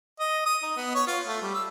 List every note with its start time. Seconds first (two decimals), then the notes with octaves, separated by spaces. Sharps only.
0.20 D#5
0.46 D#6
0.63 D#4
0.77 B3
0.95 C#5
1.08 F4
1.27 A3
1.42 G3
1.54 E6